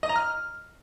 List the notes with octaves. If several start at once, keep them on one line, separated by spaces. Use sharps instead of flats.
D#5
A#5
F6